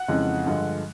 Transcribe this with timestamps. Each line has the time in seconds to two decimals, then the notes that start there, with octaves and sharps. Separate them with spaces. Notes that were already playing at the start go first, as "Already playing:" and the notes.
Already playing: F#5 F#6
0.08 F2 C#3 E3 G#3
0.46 G2 D3 F3 G#3